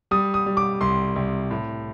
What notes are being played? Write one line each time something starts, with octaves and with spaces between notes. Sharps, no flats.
G3 D#6
D#6
G3
D6
C2 C6
C2
A2